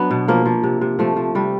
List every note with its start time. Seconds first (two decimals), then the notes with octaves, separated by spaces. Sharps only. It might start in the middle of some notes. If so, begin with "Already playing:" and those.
Already playing: F#3 B3 D4
0.11 B2
0.28 F3 A#3
0.46 F3
0.63 C3
0.81 C3
0.99 F3 A3
1.17 F3
1.35 C3 G3